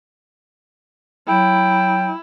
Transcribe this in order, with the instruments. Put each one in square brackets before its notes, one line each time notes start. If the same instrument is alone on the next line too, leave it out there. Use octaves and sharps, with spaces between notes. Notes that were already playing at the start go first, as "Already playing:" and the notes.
[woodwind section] F#3 G5 [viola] E4